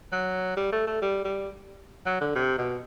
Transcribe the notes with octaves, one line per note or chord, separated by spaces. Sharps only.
F#3
G3
A3
A3
G3
G3
F#3
D3
C3
B2